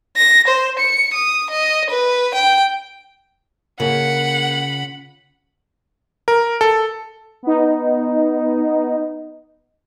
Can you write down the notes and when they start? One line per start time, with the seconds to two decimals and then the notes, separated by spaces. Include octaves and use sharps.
0.16 A#6
0.47 C5
0.79 C#7
1.13 D#6
1.50 D#5
1.90 B4
2.34 G5
3.80 C#3 A#3 F4 F#5 B5
6.28 A#4
6.61 A4
7.43 B3 D#4